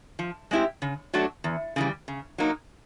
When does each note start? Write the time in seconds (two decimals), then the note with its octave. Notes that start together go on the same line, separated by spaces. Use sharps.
0.19 F3
0.51 G#3 C4 E4 G4
0.82 C#3
1.14 F#3 A3 D4 F#4
1.44 E2
1.76 C#3 E3 G3
2.08 C#3
2.38 F#3 A#3 D#4